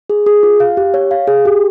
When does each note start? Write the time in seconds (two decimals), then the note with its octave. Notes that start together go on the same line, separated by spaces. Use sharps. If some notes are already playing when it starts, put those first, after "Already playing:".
0.10 G#4
0.26 G#4
0.43 F4
0.60 F5
0.77 G4
0.94 C#5
1.11 F5
1.27 G#4
1.45 G4